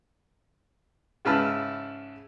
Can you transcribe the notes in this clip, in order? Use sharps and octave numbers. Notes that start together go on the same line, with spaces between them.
G#2 C#3 E4 B4 A5 F6